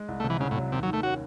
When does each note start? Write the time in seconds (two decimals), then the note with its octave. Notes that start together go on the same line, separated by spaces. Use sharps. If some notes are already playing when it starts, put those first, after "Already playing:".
Already playing: G#3
0.08 C2
0.20 A3
0.24 C3
0.30 E3
0.40 C2 C#3
0.51 A2
0.56 F#3
0.72 D#2 C3
0.83 F#3
0.88 D#3
0.93 A3
1.03 C#4 F#4